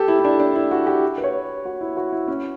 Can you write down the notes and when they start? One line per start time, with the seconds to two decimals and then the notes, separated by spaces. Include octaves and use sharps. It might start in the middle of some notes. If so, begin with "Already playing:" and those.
Already playing: G4 A4
0.08 E4
0.19 E4
0.25 D4
0.40 D4
0.55 E4
0.71 F#4
0.87 G4
1.18 B4
1.24 C#5
1.65 F#4
1.81 E4
1.97 F#4
2.12 E4
2.28 C#4